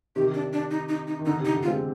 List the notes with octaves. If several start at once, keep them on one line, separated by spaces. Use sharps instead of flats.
C3 D#3 G4
D4
D4
D#4
D#4
D#4
D#3
D3 D#4
C3
D#4
D3
F4
G#3 C4